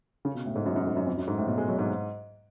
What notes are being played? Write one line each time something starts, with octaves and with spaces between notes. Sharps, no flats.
C#3
B2
A2
G#2
F#2
F#2
G#2
F#2
F2
F#2
G#2
A2
B2
G#3
F#3
G#2